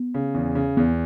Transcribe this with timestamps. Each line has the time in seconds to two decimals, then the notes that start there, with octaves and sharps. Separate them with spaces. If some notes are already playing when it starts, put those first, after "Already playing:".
Already playing: B3
0.14 C#3
0.34 E2
0.55 C#3
0.77 E2 B3